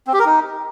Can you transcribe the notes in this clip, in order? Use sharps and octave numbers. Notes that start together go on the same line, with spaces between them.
C4
G4
A#4
D#4